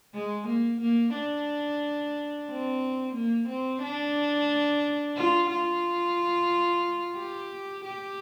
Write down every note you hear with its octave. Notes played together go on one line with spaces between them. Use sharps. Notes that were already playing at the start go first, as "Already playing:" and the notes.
G#3
A#3
A#3
D4
C4
A#3
C4
D4
F4
F4
G4
G4